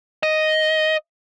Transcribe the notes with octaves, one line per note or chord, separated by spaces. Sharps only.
D#5